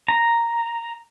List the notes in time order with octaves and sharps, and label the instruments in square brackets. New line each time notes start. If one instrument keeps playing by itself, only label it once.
[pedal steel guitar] A#5